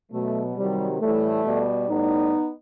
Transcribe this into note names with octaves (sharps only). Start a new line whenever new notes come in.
B2 F#3 A3
C3 D#3 F#3 G3
A2 E3 G3 A3
B2 G3
A2 G3 B3 D#4